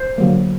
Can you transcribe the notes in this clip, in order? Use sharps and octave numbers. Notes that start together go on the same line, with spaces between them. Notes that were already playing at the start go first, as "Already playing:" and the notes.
Already playing: C5
D3 F#3 A#3